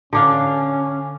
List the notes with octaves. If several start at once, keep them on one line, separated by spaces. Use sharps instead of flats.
D3 C#4 D4 F5